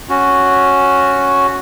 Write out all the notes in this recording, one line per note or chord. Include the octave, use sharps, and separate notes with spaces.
C#4 F#4